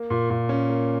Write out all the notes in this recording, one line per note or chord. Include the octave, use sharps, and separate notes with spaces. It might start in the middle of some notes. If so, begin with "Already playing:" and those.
Already playing: A#3
A#2
A#2
C#4
A#3